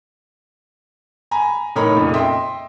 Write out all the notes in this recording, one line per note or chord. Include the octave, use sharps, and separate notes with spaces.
G#5 A#5 B5
A2 D#4 A#4 C#5 A#5 B5
F2 A#2 C#3 A3
D#5 E5 G5 C6